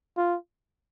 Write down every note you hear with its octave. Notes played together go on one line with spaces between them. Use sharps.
F4